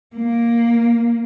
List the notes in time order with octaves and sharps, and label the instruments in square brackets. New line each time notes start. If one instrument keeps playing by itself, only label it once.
[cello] A#3